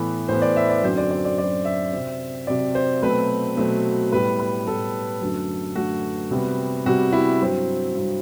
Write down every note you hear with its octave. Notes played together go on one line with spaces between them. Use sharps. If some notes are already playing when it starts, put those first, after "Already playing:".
Already playing: A2 E3 B3
A2 E3 B3 C5
D5
E5
D5
F#2 D3 F#3 C4 C5
D5
D5
D5
F#2 D3 F#3 C4 D5
E5
C3 F#3 C4
C3 F#3 C4 D5
C5
B2 F#3 A3 C4 B4
B2 F#3 A3 C4
A2 G3 B3 B4
B4
A2 G3 B3 A4
F#2 D3 F#3 A3
F#2 D3 F#3 A3 F#4
C3 G3 B3
C3 G3 B3 F#4
E4
G2 F#3 C4
G2 F#3 C4